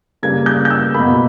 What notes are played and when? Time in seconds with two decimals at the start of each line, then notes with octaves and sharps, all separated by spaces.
0.23 C#3 G3 A#3 G#6
0.46 G6
0.65 G6
0.70 E6
0.94 B2 A#3 B5